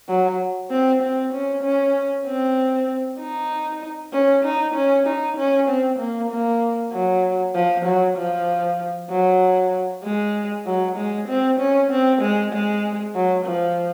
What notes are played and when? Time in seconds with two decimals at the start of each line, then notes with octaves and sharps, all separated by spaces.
0.08 F#3
0.70 C4
1.02 C4
1.33 C#4
1.63 C#4
2.26 C4
3.20 D#4
4.13 C#4
4.44 D#4
4.74 C#4
5.07 D#4
5.37 C#4
5.68 C4
5.99 A#3
6.30 A#3
6.92 F#3
7.55 F3
7.85 F#3
8.17 F3
9.10 F#3
10.04 G#3
10.66 F#3
10.97 G#3
11.28 C4
11.60 C#4
11.91 C4
12.21 G#3
12.53 G#3
13.15 F#3
13.46 F3